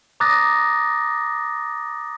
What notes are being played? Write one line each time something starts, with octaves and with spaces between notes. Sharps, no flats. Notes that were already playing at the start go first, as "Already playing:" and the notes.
A#5 D6 D#6 F#6 A6 A#6